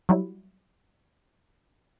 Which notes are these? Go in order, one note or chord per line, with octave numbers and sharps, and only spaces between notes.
F#3 G3 E4